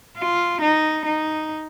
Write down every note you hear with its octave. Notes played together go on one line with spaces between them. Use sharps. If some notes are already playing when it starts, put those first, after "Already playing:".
F4
D#4
D#4